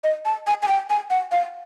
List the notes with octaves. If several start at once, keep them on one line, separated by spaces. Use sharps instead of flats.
D#5
A5
G#5
G#5
G5
G#5
F#5
F5